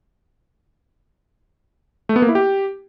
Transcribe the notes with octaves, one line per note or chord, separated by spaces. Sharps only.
A3
B3
A#3
E4
G4